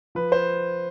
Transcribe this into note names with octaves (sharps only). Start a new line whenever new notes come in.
F3 B4
C5